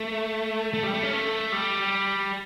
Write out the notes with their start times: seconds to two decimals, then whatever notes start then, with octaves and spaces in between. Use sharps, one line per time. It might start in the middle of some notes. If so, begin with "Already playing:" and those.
Already playing: A3
0.74 A3
0.83 G3
0.94 A3
1.03 C#4
1.13 A3
1.52 G3